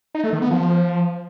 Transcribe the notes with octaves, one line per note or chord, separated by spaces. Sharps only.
D#4
A3
D#3
B3
F3